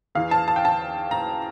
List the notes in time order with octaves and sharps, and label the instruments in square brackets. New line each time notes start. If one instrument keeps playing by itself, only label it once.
[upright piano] E2 E3 F5
A5
A5
G5
A5
A#5